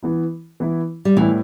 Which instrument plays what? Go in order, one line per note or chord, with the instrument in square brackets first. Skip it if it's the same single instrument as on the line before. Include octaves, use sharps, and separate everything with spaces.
[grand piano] E3 B3 E4
E3 B3 E4
[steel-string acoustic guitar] G3
[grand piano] A2 G3 B3 E4 [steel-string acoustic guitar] E3